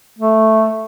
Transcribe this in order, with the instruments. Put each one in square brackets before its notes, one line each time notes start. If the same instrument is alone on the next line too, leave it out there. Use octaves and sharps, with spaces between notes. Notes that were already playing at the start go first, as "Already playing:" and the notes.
[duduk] A3